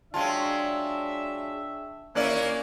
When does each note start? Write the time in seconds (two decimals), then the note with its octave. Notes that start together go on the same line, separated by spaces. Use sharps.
0.14 F#3 G#3 D4 F4 E5 G5 A5
2.15 D#2 A#3 C#4 E4 D5 F#6